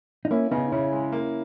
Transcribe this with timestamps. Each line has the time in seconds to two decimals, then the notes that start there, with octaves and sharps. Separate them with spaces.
0.25 D#4
0.31 A#3 C#4 E4
0.51 C#3 B3 D#4
0.72 C#3 C#4 E4
0.93 G#3
1.12 A#3